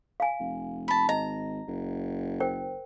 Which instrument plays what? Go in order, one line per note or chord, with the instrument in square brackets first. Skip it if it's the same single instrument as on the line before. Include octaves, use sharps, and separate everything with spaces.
[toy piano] F5 G#5
[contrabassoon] F1
[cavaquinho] A5 B5
[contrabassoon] G#1 [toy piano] D#5 [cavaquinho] A#5
[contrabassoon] F#1
[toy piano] A#4 C5 G5